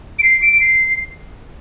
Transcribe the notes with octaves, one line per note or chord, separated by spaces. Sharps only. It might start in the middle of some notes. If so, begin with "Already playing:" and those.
D7
C7
D7
D7
C7